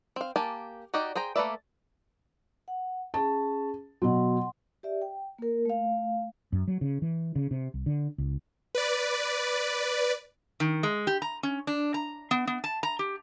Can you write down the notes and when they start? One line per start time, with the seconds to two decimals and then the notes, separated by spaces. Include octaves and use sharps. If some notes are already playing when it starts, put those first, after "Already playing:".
0.16 C4 F5
0.36 A#3 G4 G#5 A5
0.94 D#4 F#4 G4 D5 D#5
1.15 G#4 C5 G5 A#5
1.36 A3 A#3 B4 D5 E5
2.68 F#5
3.14 C#4 G#4 A5
4.02 B2 F#3 F#5 C6
4.83 G4 D5 E5
5.02 G5
5.39 A#3 A#4
5.65 A3 F5
6.53 F#2
6.68 F#3
6.81 C#3
7.02 E3
7.36 C#3
7.51 C3
7.74 C2
7.86 D3
8.18 C#2
8.75 B4 D5
10.60 D#3
10.83 G#3
11.07 G4
11.22 A#5
11.43 C#4
11.67 D4
11.94 A#5
12.31 B3
12.47 B3
12.64 A5
12.83 A#5
12.99 G4